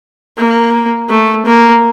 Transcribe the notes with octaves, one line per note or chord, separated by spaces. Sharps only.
A#3
A3
A#3